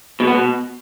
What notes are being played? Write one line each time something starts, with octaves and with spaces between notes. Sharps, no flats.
B2
B3
B2